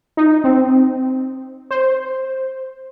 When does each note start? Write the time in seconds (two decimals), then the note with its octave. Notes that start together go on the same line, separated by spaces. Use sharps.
0.17 D#4
0.44 C4
1.71 C5